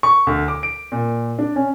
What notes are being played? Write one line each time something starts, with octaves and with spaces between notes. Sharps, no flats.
C#6
D2
D6
D7
A#2
D4
C#4